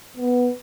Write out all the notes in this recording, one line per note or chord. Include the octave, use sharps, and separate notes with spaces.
B3